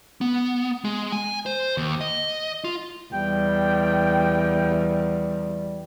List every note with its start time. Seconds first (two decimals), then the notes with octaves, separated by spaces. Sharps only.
0.21 B3
0.84 G#3
1.12 G#5
1.46 C5
1.77 D#2
2.01 D#5
2.64 F4
3.13 E2 G3 G5